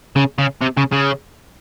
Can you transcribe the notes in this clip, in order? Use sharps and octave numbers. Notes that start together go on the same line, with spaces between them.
C#3
C#3
C3
C#3
C#3